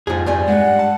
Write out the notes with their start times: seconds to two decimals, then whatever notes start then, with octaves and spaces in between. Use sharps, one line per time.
0.07 F2 G#2 F3 G#4
0.26 G2 G3 G#5
0.48 G#3 F#5
0.79 A5